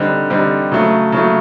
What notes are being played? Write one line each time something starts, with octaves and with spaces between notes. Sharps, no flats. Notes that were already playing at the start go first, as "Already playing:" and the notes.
Already playing: D3 G3 C4 D#4
D3 G3 C4 D#4
C#3 F#3 A3
C#3 F#3 A3